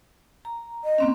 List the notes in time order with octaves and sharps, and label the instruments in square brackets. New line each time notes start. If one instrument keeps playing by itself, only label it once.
[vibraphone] A#5
[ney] D#5
[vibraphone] A#3 C4 C#4